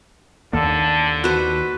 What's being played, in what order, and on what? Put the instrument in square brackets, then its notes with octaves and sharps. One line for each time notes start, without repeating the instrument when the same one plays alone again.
[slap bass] D#2 A#3 [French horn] D3 [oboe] A4
[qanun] F#4 C5 [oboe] B4